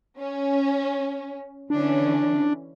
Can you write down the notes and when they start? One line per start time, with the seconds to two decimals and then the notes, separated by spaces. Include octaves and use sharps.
0.17 C#4
1.70 D3 E3 C#4 D4